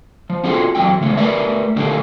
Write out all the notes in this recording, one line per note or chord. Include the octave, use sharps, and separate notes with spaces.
F3
C4 F4 F#4 G#4 A4
F#2 E3 F#3 G3 C4 G5
C#3 E3 G#3 A3
A3 A#4 B4 D5 E5
A#2 D3 D#3 G3 A3 A#3